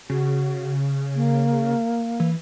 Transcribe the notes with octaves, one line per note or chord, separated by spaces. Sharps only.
C#3 F#4
A#3
E3